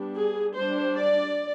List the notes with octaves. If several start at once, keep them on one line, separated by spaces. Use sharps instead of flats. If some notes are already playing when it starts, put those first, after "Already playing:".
Already playing: G3 B3 D4
G#4
G3 D4 C5
D5